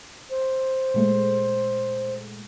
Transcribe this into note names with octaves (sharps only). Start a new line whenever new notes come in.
C5
A#2 G#3 A3